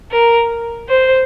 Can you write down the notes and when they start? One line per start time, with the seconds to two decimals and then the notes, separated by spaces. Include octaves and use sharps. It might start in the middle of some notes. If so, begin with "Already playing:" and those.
0.11 A#4
0.89 C5